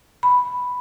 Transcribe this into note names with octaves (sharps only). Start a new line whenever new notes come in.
B5